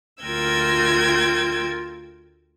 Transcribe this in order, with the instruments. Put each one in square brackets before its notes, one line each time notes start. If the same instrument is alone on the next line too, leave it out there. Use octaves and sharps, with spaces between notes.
[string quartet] D2 F4 A#4 G5 E6 G#6